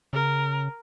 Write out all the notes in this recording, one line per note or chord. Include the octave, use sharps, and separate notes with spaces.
C#3 A#4